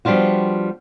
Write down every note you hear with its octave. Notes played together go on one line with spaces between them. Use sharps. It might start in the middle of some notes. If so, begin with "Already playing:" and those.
F3 G3 B3 D4 F4 F#4